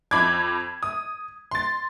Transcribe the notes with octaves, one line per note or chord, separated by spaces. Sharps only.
F2 B5 D6 G#6
D#6
C6 A6